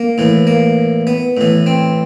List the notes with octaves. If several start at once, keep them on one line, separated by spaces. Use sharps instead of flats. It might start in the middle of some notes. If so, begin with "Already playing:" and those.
Already playing: A#3
A2 E3
A#3
B3
A2 E3
C4